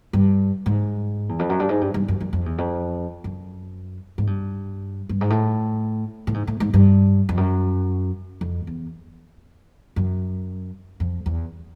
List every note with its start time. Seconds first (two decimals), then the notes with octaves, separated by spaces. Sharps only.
0.13 G2
0.66 G#2
1.29 E2
1.39 F2
1.49 F#2
1.60 G2
1.69 G#2
1.81 G2
1.94 G2
2.08 F#2
2.21 F#2
2.33 F2
2.46 E2
2.58 F2
3.24 F#2
4.18 G#2
4.27 G2
5.09 G2
5.21 G#2
5.30 A2
6.27 A2
6.34 G#2
6.47 A2
6.60 G#2
6.74 G2
7.29 F2
7.37 F#2
8.41 F2
8.67 E2
9.96 F#2
11.00 F2
11.26 E2